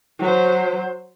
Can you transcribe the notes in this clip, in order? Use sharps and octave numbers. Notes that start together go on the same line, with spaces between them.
F#3 C5